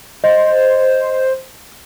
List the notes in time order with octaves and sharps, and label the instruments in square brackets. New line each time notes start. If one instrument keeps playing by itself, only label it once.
[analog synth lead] C5 [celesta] D#5